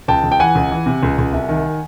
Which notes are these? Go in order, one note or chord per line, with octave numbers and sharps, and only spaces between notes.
C#2 G5 A5
C#2
G5
E3 F#5 G#5
C#2
E3
C3
C#2
C#2
C2
D#3